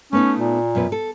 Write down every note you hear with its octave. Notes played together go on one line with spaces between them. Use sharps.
A3 B3 C#4 D#4
A#2
F#2 B2 B4
A4